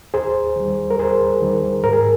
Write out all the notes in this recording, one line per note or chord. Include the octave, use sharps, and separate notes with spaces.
D#2 G#4 C5
D#3 G3
A#4
D#2 G#4 C5
D#3 G3
G#2 A#4
G#4